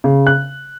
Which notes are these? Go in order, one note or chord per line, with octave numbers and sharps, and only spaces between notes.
C#3
F#6